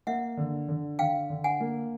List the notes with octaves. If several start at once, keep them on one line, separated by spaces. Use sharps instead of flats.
A#3 E5 F#5
D3
D3
D3 F5 G5
D3
F#5 G#5
A#3